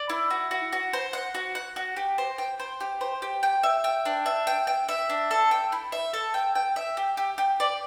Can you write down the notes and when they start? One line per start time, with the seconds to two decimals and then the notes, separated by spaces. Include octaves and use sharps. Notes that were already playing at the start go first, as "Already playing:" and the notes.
Already playing: D5
0.09 E4
0.30 F#4
0.51 F#4
0.73 F#4
0.93 C5
1.13 F#5
1.35 F#4
1.55 F#5
1.76 F#4
1.96 G4
2.18 C5
2.38 G5
2.59 C5
2.80 G4
3.01 C5
3.22 G4
3.43 G5
3.63 E5
3.84 G5
4.05 D4
4.26 E5
4.47 G5
4.67 G5
4.89 E5
5.10 D4
5.31 A4
5.51 G5
5.72 E4
5.92 E5
6.13 A4
6.34 G5
6.55 G5
6.76 E5
6.97 G4
7.17 G4
7.38 G4
7.60 D5